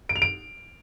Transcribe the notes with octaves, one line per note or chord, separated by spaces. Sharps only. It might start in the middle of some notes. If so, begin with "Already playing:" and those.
D7
F7
D7